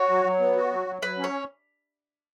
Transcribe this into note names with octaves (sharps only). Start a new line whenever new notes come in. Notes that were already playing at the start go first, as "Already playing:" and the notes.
Already playing: F#4 C#5
F#3
F#3
B3
F#4
F#3
F#3
F#3 B4
C#4
C#5